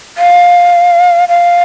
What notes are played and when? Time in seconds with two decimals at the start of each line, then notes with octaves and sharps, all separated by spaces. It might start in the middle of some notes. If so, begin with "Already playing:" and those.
0.18 F5
1.29 F5